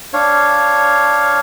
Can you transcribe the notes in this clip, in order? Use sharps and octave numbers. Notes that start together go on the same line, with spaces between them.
D4 C#5 F5